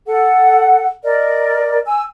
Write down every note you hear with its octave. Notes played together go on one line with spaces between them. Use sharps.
A4 F#5
A#4 D5 D#5
G#5 E6